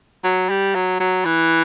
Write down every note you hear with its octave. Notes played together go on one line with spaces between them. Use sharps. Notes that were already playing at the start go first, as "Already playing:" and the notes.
F#3
G3
F#3
F#3
E3